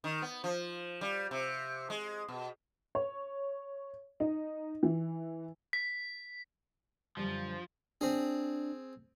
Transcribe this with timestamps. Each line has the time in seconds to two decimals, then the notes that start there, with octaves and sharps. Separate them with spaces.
0.04 D#3
0.22 B3
0.44 F3
1.01 G3
1.31 C3
1.90 G#3
2.28 B2
2.95 C#5
4.20 D#4
4.83 E3
5.73 B6
7.17 F#2 D3 F3 G3
8.01 C4 D4 G#4